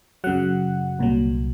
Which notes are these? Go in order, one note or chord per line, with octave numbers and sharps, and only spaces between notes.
F#2 C#3 F#3 F#5
C2 A#2 F#3